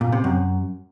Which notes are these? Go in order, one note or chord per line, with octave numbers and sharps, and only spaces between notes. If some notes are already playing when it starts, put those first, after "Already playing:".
A#2
C3
F#2